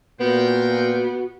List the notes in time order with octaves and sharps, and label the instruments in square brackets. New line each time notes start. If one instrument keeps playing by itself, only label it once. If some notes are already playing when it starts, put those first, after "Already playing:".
[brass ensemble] A#2 [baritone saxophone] B3 [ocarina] F#4 [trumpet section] A#4 C5 G5